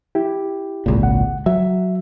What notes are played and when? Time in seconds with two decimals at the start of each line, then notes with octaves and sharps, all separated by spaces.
0.15 E4 G4
0.86 G#1 C#2 A#2
1.03 F#5
1.46 F#3 E5